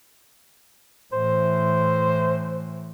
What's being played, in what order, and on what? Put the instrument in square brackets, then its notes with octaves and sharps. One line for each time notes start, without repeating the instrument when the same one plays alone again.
[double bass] A2 E3 [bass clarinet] C5